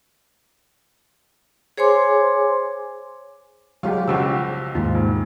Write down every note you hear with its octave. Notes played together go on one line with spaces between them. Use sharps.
G#4 C5 C#5 G#5 C6 D6
F#3 G#3 F4 G4
B1 C#3 F3 F#4 G4 E6
D#2 G#2 F4
E1